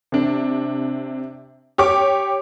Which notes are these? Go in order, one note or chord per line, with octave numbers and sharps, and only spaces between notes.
C3 D4
G4 C#5 D6